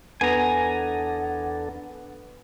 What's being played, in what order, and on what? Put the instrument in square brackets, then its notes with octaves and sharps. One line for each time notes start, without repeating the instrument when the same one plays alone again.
[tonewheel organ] E2 D4 A4 [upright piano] B3 [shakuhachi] F#5 [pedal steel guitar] G#5 A#5